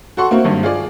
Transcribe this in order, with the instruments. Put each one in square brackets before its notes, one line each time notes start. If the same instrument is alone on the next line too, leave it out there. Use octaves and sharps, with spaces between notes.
[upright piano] F#4 A4 F#5 C6 C#6
A#3 C4 E4 F#4
G#1 G2
F4 G#4 D5